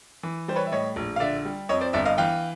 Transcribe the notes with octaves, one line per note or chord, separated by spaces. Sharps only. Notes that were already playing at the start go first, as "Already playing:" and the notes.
E3
G3 C5
B4 C#5
E5
A2 C#5 D#5
A#1
F5
D3 D5 E5
G3
F2 C#5 D#5
C5 D5
G1 D5 E5
D#5 F5
E3 F5 G5